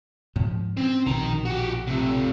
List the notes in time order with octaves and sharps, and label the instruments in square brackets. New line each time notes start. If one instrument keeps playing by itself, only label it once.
[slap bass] G#2 F3
[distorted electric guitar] C4 C5 [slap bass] C#4
[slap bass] A#1 B2 [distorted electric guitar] D#3 A#5
[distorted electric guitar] F#4 G4
C3 A3